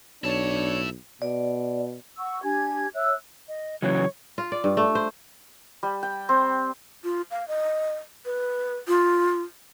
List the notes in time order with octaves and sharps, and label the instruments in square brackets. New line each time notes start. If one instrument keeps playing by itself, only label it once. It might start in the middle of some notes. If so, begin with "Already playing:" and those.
[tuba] B1 [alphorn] D4 [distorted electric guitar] E4 A5 [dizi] C#5
[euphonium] B2 [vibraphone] D5
[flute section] F#5 C#6 E6
D4 G4 G#5 G#6
C#5 E5 E6 F#6
[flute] D#5
[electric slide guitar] C#3 E3 F#3 [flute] C#5
[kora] F4
D5
G2
A3
C5
[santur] G3
G5
C4
[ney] F4
F5
D#5
B4
F4